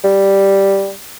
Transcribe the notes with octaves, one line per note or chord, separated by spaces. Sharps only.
G3